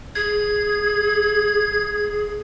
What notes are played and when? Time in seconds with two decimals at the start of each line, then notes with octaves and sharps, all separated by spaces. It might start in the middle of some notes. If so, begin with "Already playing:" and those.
0.15 G#4 G#6